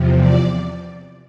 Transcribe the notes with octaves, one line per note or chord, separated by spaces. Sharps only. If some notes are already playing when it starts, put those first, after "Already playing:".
Already playing: E2 C3 F3
D5